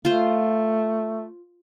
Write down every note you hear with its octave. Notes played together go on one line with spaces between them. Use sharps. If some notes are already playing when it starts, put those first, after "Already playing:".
A3 F4 C5